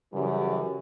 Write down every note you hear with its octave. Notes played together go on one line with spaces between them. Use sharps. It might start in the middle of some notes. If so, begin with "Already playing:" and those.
F#2 C#3 E3 G3